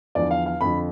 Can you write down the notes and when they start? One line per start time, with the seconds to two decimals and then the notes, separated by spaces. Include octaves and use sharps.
0.15 E2 D3 F3 D5
0.31 F5
0.46 F5
0.61 F2 D3 F3 B5